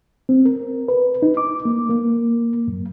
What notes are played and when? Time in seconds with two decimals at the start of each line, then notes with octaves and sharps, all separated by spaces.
0.29 C4
0.45 A#4
0.88 B4
1.22 D#4
1.37 D6
1.65 A#3
1.90 A#3
2.68 F#2